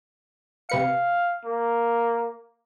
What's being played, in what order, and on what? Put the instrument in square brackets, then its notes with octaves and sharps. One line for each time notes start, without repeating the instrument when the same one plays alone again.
[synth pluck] C3 B4 C#7 [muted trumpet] F5
[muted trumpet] A#3